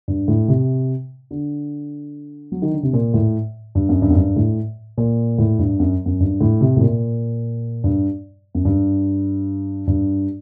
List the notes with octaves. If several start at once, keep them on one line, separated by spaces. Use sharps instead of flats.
G2
A2
C3
D3
F#3
D#3
D3
C3
A#2
A2
G2
F#2
G2
F#2
G2
A2
A#2
A2
G2
F#2
F#2
G2
A2
C3
A2
A#2
G2
F#2
G2
G2